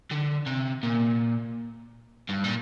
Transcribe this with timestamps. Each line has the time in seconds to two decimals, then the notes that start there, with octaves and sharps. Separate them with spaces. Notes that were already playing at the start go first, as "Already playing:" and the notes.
0.11 D3
0.46 C3
0.83 A#2
2.29 G2
2.44 A#2